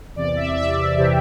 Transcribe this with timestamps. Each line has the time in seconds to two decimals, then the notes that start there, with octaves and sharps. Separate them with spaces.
0.16 E2 C3 E3 D5
0.36 E5
0.57 E5
0.97 C3 E3 G4